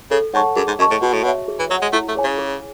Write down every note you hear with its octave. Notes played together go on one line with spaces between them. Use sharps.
C#3 A4
G#2 C#5 F#5 A5 C#6
F#2 G#4
G#2
F#2 D#5 A5 C#6
A2
B2 F#4
A2
B2 C#5 E5
G#4
E3
F#3 C#5 F#5
G#3
A3 E4
A3
G#4 C#5 G#5
C#3
G#4